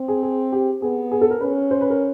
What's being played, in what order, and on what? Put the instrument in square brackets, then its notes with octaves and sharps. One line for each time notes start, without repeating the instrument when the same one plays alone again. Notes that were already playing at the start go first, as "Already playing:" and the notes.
Already playing: [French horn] C4
[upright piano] G#4
G#4
G4
[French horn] B3 [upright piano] G#4
[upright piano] G#4
A4
A#4
[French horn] C#4 [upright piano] B4
[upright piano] C5
B4
A#4